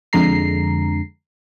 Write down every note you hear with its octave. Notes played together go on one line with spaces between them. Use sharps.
F2 D3 G#3 A#5 C7